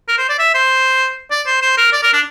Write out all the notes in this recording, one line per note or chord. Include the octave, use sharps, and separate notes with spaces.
A#4
C5
D5
E5
C5
D5
C5
C5
A#4
D5
A#4
D4